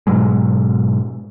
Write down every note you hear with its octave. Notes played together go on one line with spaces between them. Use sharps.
G#2 B2 F#3 G#3